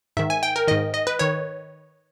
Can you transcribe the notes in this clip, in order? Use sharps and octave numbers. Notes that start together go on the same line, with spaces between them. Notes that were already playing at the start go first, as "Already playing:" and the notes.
G#2 D#3 E5
G#5
G5
A#4
G#2 D#3 D#5
D#5
B4
D#3 C#5